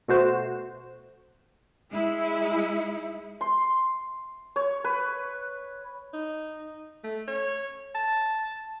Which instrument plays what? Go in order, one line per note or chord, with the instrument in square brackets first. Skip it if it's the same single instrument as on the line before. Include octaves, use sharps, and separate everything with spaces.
[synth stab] B2 A3 F#4 C5 E7
[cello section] G#3 E4
[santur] C6
C#5
B4
[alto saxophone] D#4
A3
C#5
A5